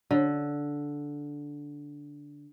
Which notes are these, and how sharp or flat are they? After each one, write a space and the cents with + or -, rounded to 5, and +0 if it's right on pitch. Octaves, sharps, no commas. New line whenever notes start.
D3 -10